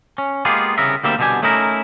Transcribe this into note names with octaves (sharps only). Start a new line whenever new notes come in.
C#4
G#3 A#3 B3 F4 G4 G#4
C2 C#3 B3 A#4 E5
D2 G3 A#3 C4 G4 E5
C2 B2 D3 G#3 G4 G#5
A3 C#4 D#4 E4 A#4